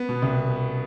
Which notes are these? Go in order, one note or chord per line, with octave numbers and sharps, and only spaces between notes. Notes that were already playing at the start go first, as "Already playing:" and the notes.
Already playing: B3
B2
C2